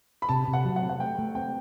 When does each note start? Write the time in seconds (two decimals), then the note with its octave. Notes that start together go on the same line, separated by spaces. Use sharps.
0.22 B5
0.29 C3 A5
0.48 C3
0.53 F#5
0.65 F#3
0.76 F#5
0.82 C4
0.89 F#5
1.00 A3 G5
1.19 A3
1.35 C4 G5